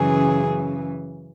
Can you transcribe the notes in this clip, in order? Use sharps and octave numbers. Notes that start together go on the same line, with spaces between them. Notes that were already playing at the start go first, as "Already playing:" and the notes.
Already playing: F#2 C#3 E3 G#4